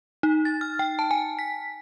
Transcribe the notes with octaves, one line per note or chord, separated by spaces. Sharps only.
D#4
A6
F6
G5
A5
G#5
B6